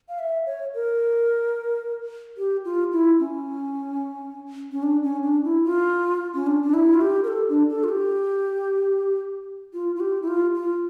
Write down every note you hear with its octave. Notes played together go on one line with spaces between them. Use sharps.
F5
E5
C#5
A#4
G4
F4
E4
C#4
C#4
D4
C#4
D4
E4
F4
C#4
D4
D4
E4
F4
G4
A#4
A4
D4
A4
F4
G4
F4
F4
G4
E4
F4
F4